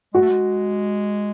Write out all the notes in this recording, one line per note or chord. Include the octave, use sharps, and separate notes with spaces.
G#3 F#4
A3
G#3